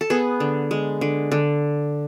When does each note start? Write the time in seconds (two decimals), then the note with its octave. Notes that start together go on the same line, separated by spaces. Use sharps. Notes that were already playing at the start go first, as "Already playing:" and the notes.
0.01 A4
0.10 B3 G#4
0.40 D3
0.71 G#3
1.01 D3
1.32 D3